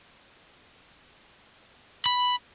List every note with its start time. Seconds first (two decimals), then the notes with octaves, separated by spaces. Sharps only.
2.06 B5